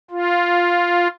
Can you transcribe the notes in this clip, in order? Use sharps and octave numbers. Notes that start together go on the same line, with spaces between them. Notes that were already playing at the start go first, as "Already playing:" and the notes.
F4